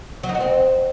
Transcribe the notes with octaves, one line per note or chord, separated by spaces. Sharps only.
F#3
D#4
F#4
C4